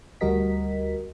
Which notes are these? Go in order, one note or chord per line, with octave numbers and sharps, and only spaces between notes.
D2 G3 F#4 A#4 D#5 B6